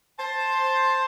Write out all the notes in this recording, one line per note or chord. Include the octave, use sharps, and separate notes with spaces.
C5 A5